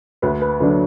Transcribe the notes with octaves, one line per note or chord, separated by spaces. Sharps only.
D2 B4
B4
D3 F#3 D4 B4